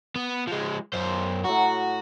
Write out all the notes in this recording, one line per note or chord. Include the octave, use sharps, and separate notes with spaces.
B3
F3 G#3
F#2 C5
A2 F#3 F#4